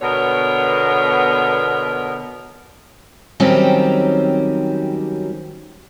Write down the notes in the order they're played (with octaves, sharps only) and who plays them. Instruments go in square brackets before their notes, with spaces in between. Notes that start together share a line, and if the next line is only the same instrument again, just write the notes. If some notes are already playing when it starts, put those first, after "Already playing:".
[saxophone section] B2 D3 B3 A#4 C#5
[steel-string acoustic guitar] D#3 F#3 G3 C4 C#4 G4